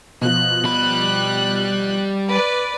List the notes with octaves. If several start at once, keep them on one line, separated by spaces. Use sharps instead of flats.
B2 F3 F#6
G3 B5
B4 D5